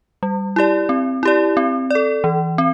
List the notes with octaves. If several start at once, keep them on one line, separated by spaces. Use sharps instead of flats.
G3
E4 G4 D5
C4
E4 G4 D5
C4
A4 D5
E3
C4